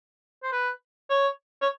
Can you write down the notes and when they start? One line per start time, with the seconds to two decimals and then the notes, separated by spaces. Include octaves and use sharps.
0.43 C5
0.52 B4
1.10 C#5
1.62 C#5